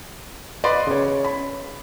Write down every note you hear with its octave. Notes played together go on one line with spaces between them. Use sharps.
B4 D5 D#5 B5 C6
C#3 C#5
B5